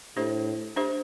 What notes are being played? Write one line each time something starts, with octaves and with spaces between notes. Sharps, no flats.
A2 D4 G4 C5 E5
D4 G4 C5 E5